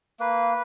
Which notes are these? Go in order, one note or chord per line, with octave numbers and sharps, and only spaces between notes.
A#3 B4